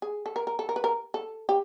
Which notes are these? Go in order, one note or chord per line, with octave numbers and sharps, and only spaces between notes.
G#4
A4
A#4
A#4
A4
A#4
B4
A#4
A4
G4